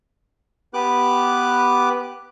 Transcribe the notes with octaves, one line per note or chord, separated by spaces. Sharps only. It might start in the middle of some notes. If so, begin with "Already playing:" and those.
B3 G4 B4 D6 F#6